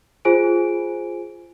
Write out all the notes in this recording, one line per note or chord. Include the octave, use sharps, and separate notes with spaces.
F4 G#4 C5 G#5 D7